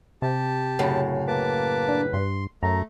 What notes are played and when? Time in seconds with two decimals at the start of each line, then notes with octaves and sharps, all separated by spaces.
0.22 C3 G4 A5
0.79 F#2 A2 C#3
1.28 A#3 B4 A5 D6
1.88 D4
2.13 G2 C6
2.63 F#2 A3 A#5